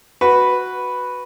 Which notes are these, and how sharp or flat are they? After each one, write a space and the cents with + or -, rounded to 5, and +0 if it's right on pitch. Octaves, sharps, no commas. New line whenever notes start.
F#4 +0 B4 +0